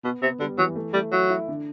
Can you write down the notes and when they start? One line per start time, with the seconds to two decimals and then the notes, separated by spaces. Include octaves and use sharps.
0.04 B2 B3
0.22 C3 B3
0.40 D3 G3
0.58 E3 F#3
0.75 A3
0.93 G3 A3
1.12 F#3 E4
1.30 E4
1.48 D3